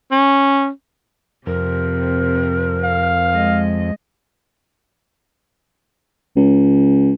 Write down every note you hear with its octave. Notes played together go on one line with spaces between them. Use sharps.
C#4
F2 C3 A#4
F5
G#3 D#5
C#2